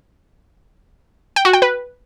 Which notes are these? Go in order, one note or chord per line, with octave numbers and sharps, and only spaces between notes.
G5
F#4
G5
B4